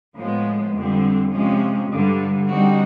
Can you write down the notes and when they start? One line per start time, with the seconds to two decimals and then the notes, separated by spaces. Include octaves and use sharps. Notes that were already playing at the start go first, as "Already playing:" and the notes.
0.18 A2 F3 G#3 B3
0.76 F2 D3 G3 C4
1.33 C3 F3 G#3 C#4
1.91 G2 D3 G3
2.48 D3 G3 C4 D#4 F#4